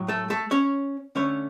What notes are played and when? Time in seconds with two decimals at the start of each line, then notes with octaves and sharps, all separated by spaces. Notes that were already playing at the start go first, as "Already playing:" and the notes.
Already playing: A2 F#3
0.08 A3 A4
0.30 A3 A4
0.51 C#4 C#5
1.15 D3 A3 C#4 C#5